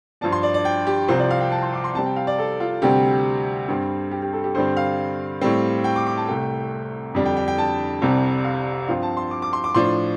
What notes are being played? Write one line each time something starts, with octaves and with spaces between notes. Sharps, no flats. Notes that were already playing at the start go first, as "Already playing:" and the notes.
G2 F3 D4 A5
C6
D5
D5
G5
G4
C2 C3 F3 C4 C5
D5
F5
G5
A5
C6
D6
C6
C3 G3 C4 A5
G5
F5
D5
A4
F4
D2 C3 G3 C4 G4
G2 G3 C4
G4
G4
A4
G4
G2 D3 G3 C4 C5
F5
A2 G3 C4
G5
D6
D6
A5
C2 C3 A3 G5
F2 D3 G3 D4
G5
G5
G5
A5
C2 C3 G3 C4
F5
G2 F3 C4 F5
A5
C6
D6
D6
C6
D6
A2 F3 D4 C6